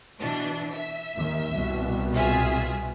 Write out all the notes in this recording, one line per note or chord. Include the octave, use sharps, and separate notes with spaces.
B2 E3 D4
E5
D#2 D#3
C2 B2 G3
F4 G#4 E5